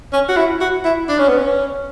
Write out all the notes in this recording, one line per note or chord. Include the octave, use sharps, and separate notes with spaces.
C#4
F#4
E4
F#4
E4
D4
C#4
B3
C#4